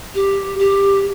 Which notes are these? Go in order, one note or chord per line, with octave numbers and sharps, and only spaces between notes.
G4
G4